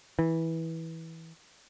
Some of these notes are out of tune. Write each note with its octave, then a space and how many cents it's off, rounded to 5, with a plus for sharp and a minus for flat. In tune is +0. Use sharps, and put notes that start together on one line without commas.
E3 -15